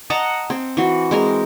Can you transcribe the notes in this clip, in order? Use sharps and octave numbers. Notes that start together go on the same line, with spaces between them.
D#5 F#5 A5 A#5
C4
E3 F#4
G#3 C4 A#4